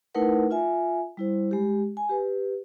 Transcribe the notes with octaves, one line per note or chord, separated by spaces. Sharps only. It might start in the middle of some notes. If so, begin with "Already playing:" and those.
A3 D#4 E4 A#4 B4 F#5
F4 E5 G#5
G3 E4 C5
G#3 G4
G#5
G4 B4